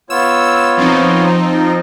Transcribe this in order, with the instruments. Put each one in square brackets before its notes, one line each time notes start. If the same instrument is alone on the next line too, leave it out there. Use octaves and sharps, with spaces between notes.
[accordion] B3 F4 C#5 [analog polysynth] E6
[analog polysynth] F3 C4 D#4